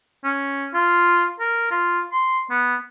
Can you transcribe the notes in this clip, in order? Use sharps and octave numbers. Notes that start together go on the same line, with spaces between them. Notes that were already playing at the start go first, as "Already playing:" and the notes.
C#4
F4
A#4
F4
C6
B3